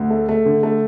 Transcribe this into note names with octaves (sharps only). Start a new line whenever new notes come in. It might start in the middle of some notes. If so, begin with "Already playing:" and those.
Already playing: D2
A3
A3
D3
A3